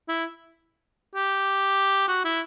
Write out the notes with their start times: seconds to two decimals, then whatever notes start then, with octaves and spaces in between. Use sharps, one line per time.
0.08 E4
1.15 G4
2.08 F#4
2.25 E4